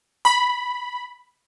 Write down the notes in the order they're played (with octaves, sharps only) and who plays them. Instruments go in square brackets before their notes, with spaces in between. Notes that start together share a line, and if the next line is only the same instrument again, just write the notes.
[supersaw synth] B5